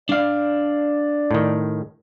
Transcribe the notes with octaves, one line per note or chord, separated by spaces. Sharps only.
D4 D5 F5
A2 D#3